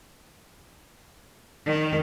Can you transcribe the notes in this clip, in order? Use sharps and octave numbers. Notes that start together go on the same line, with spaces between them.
D#3